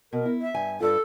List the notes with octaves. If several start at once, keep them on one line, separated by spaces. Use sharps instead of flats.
B2 A#4
E4
E5
G2 G#5
G2 F4 A4